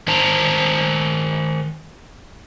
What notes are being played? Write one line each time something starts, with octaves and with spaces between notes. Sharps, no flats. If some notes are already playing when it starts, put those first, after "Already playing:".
D#3 C5 A5 A#5